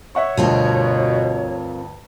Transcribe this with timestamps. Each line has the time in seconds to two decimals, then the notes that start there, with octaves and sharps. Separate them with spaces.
0.15 C#5 E5 F#5 C#6
0.37 D2 G2 B2 C4 F4 A#4